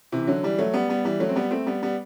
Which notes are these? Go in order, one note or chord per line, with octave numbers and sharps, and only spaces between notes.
C3 E3
D3 F#3
E3 G3
F#3 A3
G3 B3
G3 B3
E3 G3
F#3 A3
C4
G3 B3
A3 C4
G3 B3
G3 B3